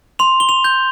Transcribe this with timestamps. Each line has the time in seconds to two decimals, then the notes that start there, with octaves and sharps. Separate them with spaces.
0.19 C6 F7
0.40 G7
0.49 F7
0.64 G6